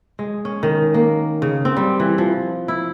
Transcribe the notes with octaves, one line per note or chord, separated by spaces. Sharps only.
G#3
C#4
D#3
A#3
C#3
C4
G3
E3
F3
E4